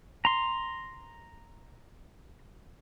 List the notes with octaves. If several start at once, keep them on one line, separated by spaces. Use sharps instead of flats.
A#5 C6